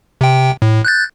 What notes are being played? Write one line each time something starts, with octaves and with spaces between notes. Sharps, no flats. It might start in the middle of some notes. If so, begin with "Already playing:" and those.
C3 G5
A2
F#6 G6 A6